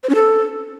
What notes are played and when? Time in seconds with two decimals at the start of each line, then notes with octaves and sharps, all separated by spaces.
0.03 C5
0.09 C#4
0.15 A4